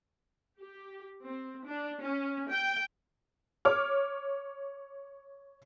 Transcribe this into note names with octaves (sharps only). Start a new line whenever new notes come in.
G4
C4
D4
C#4
G5
C#5 D6 F6